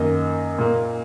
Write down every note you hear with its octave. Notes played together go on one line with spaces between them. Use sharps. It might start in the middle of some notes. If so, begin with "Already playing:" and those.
Already playing: F#2 D#3 A#3 D#5
A#2 A#3